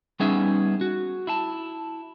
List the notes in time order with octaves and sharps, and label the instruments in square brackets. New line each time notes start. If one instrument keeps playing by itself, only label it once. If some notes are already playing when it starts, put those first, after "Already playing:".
[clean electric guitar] G3 B3 C#4 D#4 G#4 E5
F#4
E4 A5